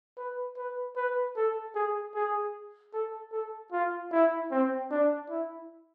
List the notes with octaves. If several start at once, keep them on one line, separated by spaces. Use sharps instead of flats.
B4
B4
B4
A4
G#4
G#4
A4
A4
F4
E4
C4
D4
E4